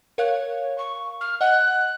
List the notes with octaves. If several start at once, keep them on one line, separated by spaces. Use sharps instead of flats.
A#4 C#5 F5 F#6
C#6
F6
D#5 F#5 F#6